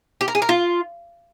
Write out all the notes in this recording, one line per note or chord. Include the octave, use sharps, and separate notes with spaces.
G4
A#4
G#4
A#4
F4